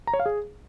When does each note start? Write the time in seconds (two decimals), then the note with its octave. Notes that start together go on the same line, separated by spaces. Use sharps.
0.07 A#5
0.13 C#5
0.20 F5
0.26 G#4